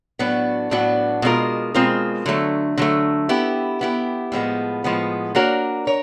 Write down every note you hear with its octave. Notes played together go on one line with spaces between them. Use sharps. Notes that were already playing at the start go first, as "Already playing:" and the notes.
A2 F#3 B3 D4 F#4
A2 F#3 B3 D4 F#4
B2 G#3 C4 F4 A#4
B2 G#3 C4 F4 A#4
D3 F#3 A3
D3 F#3 A3
B3 E4 G4
B3 E4 G4
A2 F3 G#3 B3
A2 F3 G#3 B3
A#3 D4 F#4 A#4 C#5
A#4 C#5